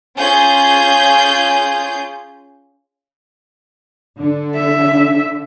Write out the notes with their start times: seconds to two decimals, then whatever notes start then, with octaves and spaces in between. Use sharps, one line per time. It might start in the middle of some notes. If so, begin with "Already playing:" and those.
0.19 C#4 F4 G#4 G6
4.19 D3
4.56 E5